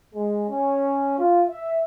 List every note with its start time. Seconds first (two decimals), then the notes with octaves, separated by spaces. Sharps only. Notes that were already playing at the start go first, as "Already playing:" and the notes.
0.15 G#3
0.49 C#4
1.19 F4
1.48 E5